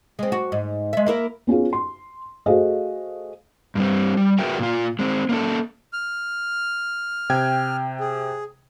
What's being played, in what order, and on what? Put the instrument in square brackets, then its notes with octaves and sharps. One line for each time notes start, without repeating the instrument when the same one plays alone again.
[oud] G#3 C4
F#4
G#2
G#3 E5
A#3 E4 A#4
[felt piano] B3 C#4 F4 G#4
C6
A3 F#4 G#4 C5 D#5 F5
[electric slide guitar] G2 G3 C4
G3
F#4 G#4 A#4 B4 E5 G5
A#2 F4
G#3 C4
A#3 C#4 A4
[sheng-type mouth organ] F6
[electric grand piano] C3 G5 G#6
[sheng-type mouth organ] G#4